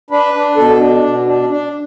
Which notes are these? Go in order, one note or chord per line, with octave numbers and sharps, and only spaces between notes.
D4 B4
D4
B2 A4
D4
B2
D4
D4